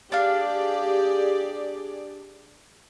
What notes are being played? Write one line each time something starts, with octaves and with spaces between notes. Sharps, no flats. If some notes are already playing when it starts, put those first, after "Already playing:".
D4 G4 G#4 D5 F5